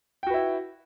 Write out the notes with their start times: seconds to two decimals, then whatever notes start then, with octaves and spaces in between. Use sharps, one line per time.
0.23 G5
0.27 F#4
0.30 B4
0.34 E4